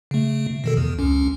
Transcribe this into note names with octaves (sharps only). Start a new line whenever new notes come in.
C#3 A3
B2 D#3 A4
E2
C#2 C#4